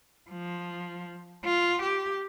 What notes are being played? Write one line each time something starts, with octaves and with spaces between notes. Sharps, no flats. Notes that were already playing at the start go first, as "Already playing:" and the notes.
F3
F4
G4